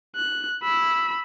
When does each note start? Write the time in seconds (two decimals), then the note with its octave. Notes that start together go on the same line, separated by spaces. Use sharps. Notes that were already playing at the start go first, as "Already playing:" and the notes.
0.16 F#6
0.63 B5 E6